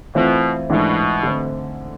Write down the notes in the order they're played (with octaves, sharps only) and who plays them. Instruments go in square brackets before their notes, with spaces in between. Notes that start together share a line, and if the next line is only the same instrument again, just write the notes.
[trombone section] B2 [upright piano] E3 A3 C4 F4
[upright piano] G#2 E3 A3 D4 [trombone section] B2
[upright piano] D3 A3 C4